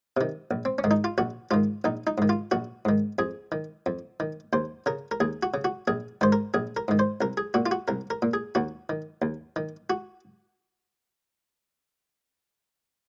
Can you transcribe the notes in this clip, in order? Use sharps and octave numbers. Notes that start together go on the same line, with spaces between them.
C3 D#3
A#1
C4
C#4
G#2 D#3
D#4
F4
A#1 F#4
G#2 D#3 F4
A#1 D#4
D#4
G#2 D#3
F4
A#1 F#4
G#2 D#3
F2 G#4
D#3
F2
D#3
D#2 C5
C#3 A#4
A#4
D#2 G#4
F#4
C#3
F#4
A#1 G#4
G#2 D#3 C5
A#4
A#1 G#4
A#4
G#2 D#3
C5
C2 A#4
G#4
A#2 F#4
F4
F#4
C2 A#4
A#4
A#2
G#4
D#2 F#4
D#3
D#2
D#3
F#4